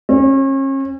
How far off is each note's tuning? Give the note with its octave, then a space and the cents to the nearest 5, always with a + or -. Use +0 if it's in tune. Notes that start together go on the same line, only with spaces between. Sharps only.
C#4 -40